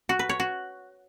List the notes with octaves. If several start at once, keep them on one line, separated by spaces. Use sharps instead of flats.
F#4
B4
C#5
F#4